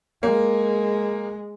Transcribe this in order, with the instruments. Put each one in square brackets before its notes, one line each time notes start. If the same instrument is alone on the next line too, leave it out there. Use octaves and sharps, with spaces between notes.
[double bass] G#3 [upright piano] A#3